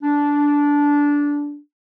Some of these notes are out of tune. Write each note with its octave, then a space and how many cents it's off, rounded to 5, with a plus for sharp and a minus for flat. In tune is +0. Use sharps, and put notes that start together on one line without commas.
D4 -15